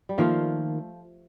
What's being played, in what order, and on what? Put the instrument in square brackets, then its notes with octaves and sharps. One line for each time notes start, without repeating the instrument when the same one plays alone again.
[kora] G3
[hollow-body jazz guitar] D#3 A#3 F4 [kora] F3 A3